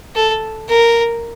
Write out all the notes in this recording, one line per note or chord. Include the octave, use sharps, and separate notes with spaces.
A4
A#4